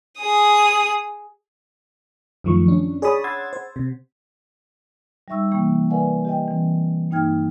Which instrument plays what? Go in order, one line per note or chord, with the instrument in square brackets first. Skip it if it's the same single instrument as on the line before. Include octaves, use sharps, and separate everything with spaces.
[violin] G#4 D#6
[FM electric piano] F#2 D#3 F3 A3 C#6
C#4 D4
G#4 C#5 D5 A5 B5 D#6
F#5 C6 E6 G#6 A6
C5
C3
[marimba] G3 D#4 E5 C#6 E6
C3 E3 A#3 G5 C#6
A#4 B4 D5 E5 F#5 G#5
G4 D#5 G5
E3 C4
G2 A#3 D#4 G5 F6 G#6